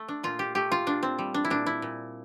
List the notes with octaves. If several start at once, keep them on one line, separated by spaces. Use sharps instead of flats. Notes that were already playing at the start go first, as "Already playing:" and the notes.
Already playing: A3
D4
A#2 F4
G4
A3 G4
F4
A#2 D4
C4
G3
D4
E4
A#2 D4
E4
A#2